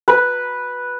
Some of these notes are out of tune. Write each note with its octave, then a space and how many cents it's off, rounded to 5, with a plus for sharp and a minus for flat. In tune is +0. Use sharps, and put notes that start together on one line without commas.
B4 -5